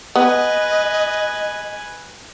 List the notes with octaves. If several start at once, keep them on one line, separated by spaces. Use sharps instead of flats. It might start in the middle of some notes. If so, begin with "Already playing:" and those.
B3 B4 D#5 G#5